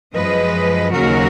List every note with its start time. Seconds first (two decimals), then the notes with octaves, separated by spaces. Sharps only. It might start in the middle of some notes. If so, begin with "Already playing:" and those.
0.15 F#2 F3 G#3 B4 D#5
0.93 D#2 C#3 F#3 F#4 A#4